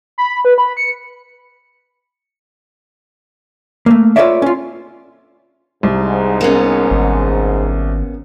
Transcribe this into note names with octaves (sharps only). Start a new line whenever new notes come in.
B5
B4
B5
C#7
A3 A#3
F4 A4 B4 C#5 D5 E5
C#4 F4
C2 G#2
A#3 B3 C#4
G#1